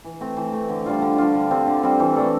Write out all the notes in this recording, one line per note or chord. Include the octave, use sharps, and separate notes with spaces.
E3
A3 C4
E3
A3 C4
D3
G3 D4 F4
D3
G3 D4 F4
D3
G3 C4
D3
G3 C4
E3
A3 D4 A4